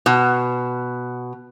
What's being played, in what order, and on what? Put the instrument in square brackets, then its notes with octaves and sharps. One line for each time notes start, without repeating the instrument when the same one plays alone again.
[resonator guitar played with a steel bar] B2